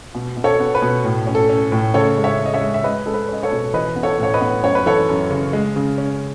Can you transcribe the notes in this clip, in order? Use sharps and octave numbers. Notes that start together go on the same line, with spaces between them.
B2
B2
A4 C#5
B3
B4
B2
A2
C#4
A4
C#4
A2
C#3 A4 C#5
G#3
C#5 E5
C#4
D#5
C#5 E5
G#3
E5
G#3 B4 D#5
G#3 A4
B4
C#4 D#5
A4 C#5
B2
E3 B4 D#5
B3
A4 C#5
A2 C#5
B4 D#5
B3
F#2 C#5
B4
E3 A4 C#5
F#2
C#3
G#3
C#3
C#4